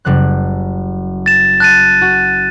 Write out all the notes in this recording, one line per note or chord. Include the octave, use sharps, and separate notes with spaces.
F#1 G3 F#6
A6 E7
A5 F#6 A6 D#7
F#4